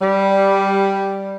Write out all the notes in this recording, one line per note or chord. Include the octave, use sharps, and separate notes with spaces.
G3